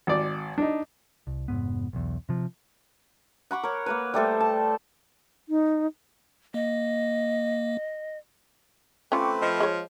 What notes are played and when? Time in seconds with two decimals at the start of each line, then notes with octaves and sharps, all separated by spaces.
0.07 G#1 D5
0.58 D4 D#4
1.27 C2
1.48 F1 E2 G#2 B3
1.93 B1 E2
2.29 C3 F3
3.51 F#5 B5 C#6 D6
3.64 A#4 C#5
3.86 A#3 A#4 B4
4.14 G3 A3 A4 C5
4.40 A5
5.49 D#4
6.54 A#3 D#5
9.12 A3 C4 C#4 F4 B4 G5 C#6 D6
9.42 F3 D#5
9.60 G#3 C#5